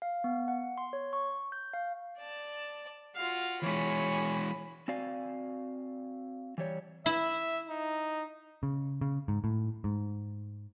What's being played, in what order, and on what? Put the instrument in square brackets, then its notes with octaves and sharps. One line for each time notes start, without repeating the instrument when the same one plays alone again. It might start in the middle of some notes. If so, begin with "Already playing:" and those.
[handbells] F5
B3
F#5
C6
C#5
C#6
G6
F5
[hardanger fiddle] D5 A5
[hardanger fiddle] F4 F#4 [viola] F5
[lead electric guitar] E3 G#3 [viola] C#5 G#5 [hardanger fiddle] B5
[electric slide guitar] C4 F#4 D5 F5 G#5
E3 G3 C#5
[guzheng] E4 [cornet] E5
[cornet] D#4
[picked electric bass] C#3
C#3
G#2
A2
G#2